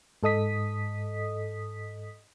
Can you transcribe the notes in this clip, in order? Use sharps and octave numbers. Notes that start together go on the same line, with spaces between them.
G#2 A4 D#5 D#6 B6